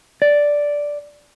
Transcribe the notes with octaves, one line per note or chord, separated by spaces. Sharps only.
D5